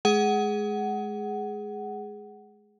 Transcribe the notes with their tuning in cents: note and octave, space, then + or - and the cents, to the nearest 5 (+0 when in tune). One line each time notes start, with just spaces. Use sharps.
G#3 +25 G#4 +0 F#5 +15